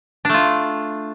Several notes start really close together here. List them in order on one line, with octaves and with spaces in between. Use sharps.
D4 A3 F4